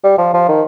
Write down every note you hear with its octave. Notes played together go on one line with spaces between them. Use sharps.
G3
F3
F3
D#3